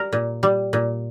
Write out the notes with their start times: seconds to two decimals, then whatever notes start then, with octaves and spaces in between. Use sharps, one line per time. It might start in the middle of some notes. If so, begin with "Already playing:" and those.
Already playing: G3 A#4
0.13 A#2
0.43 G3
0.73 A#2